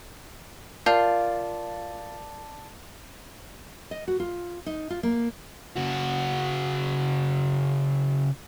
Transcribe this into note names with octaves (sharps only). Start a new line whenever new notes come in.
F4 A#4 D5 F5 A5 G6
D#5
F#4
F4
D#4
F4
A#3
C#3 F#4